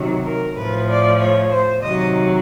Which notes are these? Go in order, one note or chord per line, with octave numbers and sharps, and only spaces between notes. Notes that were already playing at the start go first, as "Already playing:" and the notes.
Already playing: C3 D#3 F#3
A#4
A2 F3 B4
D5
C#5
C5
C3 D#3 F#3 D#5